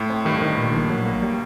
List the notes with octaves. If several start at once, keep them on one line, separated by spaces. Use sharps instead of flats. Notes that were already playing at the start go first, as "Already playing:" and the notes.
Already playing: A2
C4
G2 D#3
D#3
A#2
A#1
F#3
A#3
G3